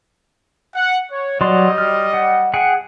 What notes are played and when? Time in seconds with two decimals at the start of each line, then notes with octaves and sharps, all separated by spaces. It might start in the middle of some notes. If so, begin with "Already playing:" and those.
0.75 F#5
1.10 C#5
1.41 F#3 G3 D5 D#5 C6
1.78 F6
2.14 F#5
2.54 G#4 F#5 G5